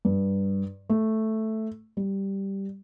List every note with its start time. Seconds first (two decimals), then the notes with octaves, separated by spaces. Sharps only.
0.05 G2
0.90 A3
1.97 G3